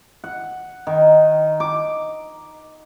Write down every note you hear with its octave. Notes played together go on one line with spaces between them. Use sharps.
F#5
D#3
D6